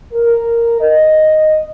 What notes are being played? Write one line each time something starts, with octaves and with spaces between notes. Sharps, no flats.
A#4
D#5